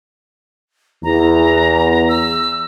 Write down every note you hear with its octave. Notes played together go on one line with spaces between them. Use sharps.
E2 A#5
E6